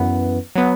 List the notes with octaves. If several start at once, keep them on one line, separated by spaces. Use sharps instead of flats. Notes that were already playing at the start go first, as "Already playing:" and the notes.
Already playing: F#2 E3 B3
F#3 B3